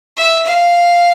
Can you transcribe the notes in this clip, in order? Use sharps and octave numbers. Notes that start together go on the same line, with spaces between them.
E5
F5